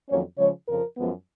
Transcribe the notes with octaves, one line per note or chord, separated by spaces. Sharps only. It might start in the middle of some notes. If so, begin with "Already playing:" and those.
F2 D#3 F#3 A#3 C#4 C#5
C#3 F3 G#3 C#5
F2 C#3 F3 A#4
F#2 F3 G#3 B3